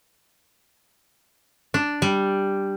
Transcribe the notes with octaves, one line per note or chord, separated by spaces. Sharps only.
D4
G3